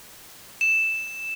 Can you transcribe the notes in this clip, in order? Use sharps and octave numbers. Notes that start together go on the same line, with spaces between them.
E7